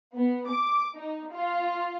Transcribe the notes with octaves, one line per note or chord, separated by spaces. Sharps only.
B3
D6
D#4
F4